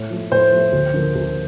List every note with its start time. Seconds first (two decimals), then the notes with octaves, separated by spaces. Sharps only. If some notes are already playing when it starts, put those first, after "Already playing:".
Already playing: A2
0.10 F3 A3
0.31 A2 C5
0.52 F3 A3
0.72 D2
0.94 D3 F3 A#3
1.15 D2